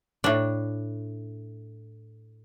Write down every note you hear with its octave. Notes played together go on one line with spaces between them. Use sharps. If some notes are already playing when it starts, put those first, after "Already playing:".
A2 D4